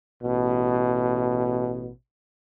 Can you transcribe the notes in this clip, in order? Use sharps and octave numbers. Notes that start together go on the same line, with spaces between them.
A1 B2